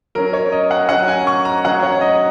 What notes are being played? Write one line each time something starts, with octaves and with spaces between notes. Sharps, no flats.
F#3 C#4 A#4
C#5
D#5
F#5
F#3 C#4 F#5
G#5
C#6
A#5
F#3 C#4 F#5
C#5
D#5